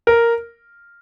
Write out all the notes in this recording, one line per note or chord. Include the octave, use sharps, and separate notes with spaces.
A#4